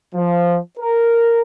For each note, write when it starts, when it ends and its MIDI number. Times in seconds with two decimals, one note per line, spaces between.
0.15 0.59 53
0.79 1.42 70